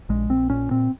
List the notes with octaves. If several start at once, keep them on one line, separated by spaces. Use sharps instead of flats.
A#1 G#3
A#1 C4
A#2 C#4
A#2 C4